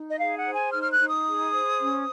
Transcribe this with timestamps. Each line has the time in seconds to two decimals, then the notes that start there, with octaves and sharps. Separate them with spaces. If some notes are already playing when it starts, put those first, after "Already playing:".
Already playing: D#4
0.08 D#5
0.18 G#4 F5
0.37 F#5
0.45 C5
0.54 G#5
0.72 D#4 F6
0.83 F6
0.91 F#6
0.99 D#4
1.08 D#6
1.26 G#4
1.52 C5
1.79 C#4